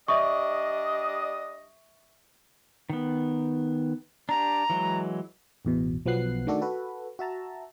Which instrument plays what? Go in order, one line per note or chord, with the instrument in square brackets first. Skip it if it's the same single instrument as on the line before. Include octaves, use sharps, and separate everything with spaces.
[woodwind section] G3 D4 D#5 [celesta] E5 C#6
[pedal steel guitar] D#3 B3
[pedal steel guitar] D4 G4 [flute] A#5
[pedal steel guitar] E3 F#3 G#3
[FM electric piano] A1 E2 B2
B1 F3 F#3 B3 F#6 C7
D#3 A3 D4 F#4 A4 D5
F#4 A4 B4
F#4 E5 A5 A#5